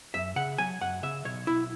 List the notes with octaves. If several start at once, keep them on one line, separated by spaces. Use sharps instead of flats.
F#2 E5
C#3 F#5
F#3 G#5
F#2 F#5
C#3 E5
B1 C#5
B1 E4